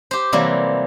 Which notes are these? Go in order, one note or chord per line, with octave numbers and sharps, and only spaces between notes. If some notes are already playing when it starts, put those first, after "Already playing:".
G4 C5
C3 E3 F#3 G3 A#3